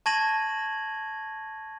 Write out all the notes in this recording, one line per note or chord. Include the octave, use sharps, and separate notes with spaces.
A5 C#6 G#6 A#6 D#7 F#7